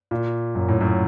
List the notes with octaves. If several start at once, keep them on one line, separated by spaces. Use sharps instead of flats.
A#2
F#2
A2
F#2